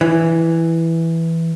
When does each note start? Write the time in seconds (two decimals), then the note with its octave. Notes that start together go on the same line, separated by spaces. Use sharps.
0.01 E3